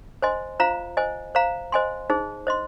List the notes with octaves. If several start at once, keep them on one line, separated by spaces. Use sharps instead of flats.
C5 D#5 G#5 C6
F4 C5 F5 A#5
C5 D#5 G#5
C5 F5 A#5
C5 D#5 G#5 C6
D#4 G#4 C5
C5 D#5 C6